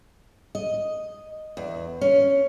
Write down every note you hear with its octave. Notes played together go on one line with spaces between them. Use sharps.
D#5
E2
C#4